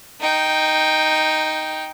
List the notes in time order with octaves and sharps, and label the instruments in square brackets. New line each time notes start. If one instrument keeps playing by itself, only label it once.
[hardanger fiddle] D#4 G5